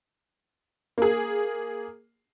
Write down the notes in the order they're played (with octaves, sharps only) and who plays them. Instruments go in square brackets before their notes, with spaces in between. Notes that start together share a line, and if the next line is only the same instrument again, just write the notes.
[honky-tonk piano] A#3 G#4